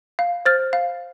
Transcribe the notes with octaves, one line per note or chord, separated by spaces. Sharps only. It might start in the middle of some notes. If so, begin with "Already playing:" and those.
F5
C5 F6 A6
F5